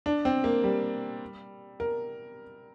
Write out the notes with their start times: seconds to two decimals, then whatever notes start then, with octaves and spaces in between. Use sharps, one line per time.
0.06 D4
0.25 C4
0.44 A#3
0.64 G3
1.80 A#4